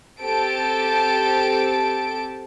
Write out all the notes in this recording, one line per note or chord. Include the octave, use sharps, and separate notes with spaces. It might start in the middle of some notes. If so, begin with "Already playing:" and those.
C4 G4 A4 A5 D7